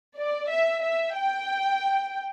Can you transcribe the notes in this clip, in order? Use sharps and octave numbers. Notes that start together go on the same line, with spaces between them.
D5
E5
E5
G5